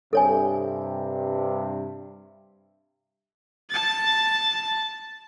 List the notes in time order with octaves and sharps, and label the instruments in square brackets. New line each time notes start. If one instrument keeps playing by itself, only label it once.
[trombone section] G2 C3 [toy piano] A4 C#5 G#5
[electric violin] A5 A6